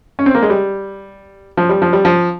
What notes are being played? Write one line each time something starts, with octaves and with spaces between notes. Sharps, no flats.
C#4
C4
A#3
G#3
G3
F3
G3
F3
G3
F3